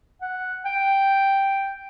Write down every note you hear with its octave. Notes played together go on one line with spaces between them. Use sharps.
F#5
G5